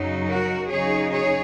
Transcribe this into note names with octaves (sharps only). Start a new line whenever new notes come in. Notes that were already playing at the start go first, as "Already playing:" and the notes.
Already playing: F#2 C#3 F#3 D#4
F#4 A#4
C#3 F#3 D#4 G#4 C#5
G#4 C#5